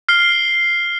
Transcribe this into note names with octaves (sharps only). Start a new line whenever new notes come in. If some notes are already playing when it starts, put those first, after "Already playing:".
F6 C7 G7